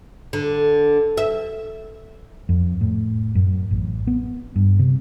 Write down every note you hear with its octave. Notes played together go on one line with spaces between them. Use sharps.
D3
E5
F2
A2
F#2
A1
B3
G2
C3